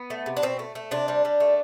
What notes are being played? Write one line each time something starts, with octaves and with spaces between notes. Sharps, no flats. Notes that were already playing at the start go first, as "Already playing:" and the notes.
Already playing: B3
A3
C3
D4
B2 C4
A3
A3
C3 D4
G3
G3
A3